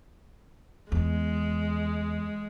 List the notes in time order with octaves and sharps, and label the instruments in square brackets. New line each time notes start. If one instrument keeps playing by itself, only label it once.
[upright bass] E2 [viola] G#3